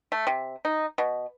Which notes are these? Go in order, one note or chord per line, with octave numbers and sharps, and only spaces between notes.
A3
C3
D#4
B2